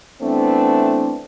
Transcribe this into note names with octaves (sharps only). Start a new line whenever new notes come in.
E3 A3 B3 C4 D4